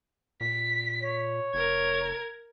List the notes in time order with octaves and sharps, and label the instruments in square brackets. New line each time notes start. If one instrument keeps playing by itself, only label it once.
[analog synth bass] A#2 [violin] B6
[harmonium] C#5
[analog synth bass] F1 [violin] A#4 G#6